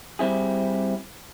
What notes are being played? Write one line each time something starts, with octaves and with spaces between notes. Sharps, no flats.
G3 C4 E4 G#4